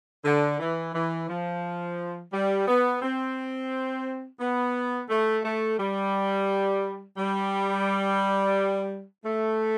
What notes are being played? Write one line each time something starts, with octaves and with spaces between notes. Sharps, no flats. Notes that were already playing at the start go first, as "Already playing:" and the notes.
D3
E3
E3
F3
G3
B3
C4
B3
A3
A3
G3
G3
A3